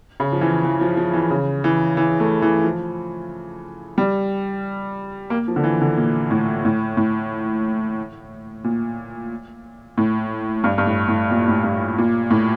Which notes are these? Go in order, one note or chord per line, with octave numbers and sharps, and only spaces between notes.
C#3
F3
E3
E3
F3
F3
E3
C#3
E3
E3
A3
E3
F3
G3
A#3
F3
D3
E3
D3
A#2
A2
A2
A2
A#2
A2
G2
G2
A2
A2
A#2
A2
G2
A#2
A2